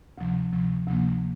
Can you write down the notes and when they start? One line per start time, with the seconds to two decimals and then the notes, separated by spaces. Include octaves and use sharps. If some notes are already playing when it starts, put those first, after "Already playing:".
0.18 D2 C3 F3
0.52 D2 C3 F3
0.87 D2 C3 F3 A#3